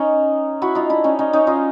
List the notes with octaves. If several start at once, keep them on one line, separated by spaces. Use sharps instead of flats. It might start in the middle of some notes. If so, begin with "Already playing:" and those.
Already playing: C#4 D#4
E4 F#4
D#4 F4
D4 E4
C#4 D#4
C#4 D#4
C#4 D#4
D#4 F4